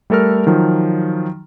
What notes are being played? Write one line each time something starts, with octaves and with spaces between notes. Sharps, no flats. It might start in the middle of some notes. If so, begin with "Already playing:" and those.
G3 A3 A4 A#4 F6
D#3 F3 F#3